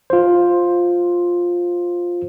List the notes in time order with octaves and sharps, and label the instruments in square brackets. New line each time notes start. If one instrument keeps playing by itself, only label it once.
[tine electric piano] F4 C5